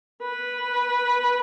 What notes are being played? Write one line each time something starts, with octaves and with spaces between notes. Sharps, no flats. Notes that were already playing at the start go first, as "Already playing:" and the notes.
B4